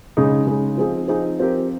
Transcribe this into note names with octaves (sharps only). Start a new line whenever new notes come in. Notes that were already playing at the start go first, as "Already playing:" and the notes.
C#3 G#3 D#4
C#3 G#3 D#4
F3 C4 D#4 G#4
F3 C4 D#4 G#4
F3 C4 G4 A#4